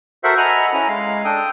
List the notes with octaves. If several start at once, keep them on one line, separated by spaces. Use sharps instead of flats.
F#4 A4 A#4 C5 E5 F#5
A4 D#5 F#5 G#5 A#5 B5
C#4 E4 G#5 A#5
G#3 F5
D4 A4 G5 D#6